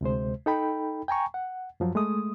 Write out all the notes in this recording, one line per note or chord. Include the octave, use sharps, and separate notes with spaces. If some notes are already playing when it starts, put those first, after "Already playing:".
D2 C3 G#3 C5
D#4 A4 G5 B5
G5 G#5 A#5 C#6
F#5
F#2 F3 F#3
G#3 A3 D#6